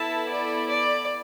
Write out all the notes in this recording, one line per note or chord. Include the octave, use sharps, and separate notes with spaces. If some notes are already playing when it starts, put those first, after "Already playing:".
Already playing: B3 E4 A4 E5 A5
D5
D5